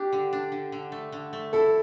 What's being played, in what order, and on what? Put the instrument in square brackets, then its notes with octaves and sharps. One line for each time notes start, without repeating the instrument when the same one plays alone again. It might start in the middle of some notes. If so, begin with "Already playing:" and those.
Already playing: [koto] D4 [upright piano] G4
[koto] D3
D4
D3
D3
A3
D3
A3
[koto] E4 [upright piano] A4